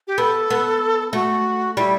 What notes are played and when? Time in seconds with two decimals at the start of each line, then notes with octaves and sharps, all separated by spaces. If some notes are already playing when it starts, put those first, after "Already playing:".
0.07 G4
0.18 B3 A4
0.50 B3
1.13 A3 F#4
1.77 G3 E4